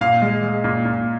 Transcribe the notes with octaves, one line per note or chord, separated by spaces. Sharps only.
A#2 F5
G#3
G#3
A#2
A#2